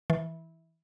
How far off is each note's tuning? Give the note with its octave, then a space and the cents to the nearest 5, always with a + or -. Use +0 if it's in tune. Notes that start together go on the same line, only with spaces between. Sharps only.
E3 -15